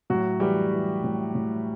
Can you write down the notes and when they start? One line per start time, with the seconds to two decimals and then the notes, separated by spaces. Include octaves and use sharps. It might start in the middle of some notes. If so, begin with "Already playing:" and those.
0.10 A2 F#3 F#4
0.40 E3 G3 G4
0.72 E3
1.04 A2
1.35 A2